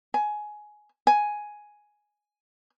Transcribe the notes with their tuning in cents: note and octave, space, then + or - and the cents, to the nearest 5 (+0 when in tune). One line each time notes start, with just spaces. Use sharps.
G#5 +15
G#5 +5